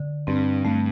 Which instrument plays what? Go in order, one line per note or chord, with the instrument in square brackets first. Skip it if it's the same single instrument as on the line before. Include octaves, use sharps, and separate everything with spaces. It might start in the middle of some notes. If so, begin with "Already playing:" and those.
Already playing: [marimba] D3
[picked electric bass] G2 [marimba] C4
[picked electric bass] G2 [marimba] A3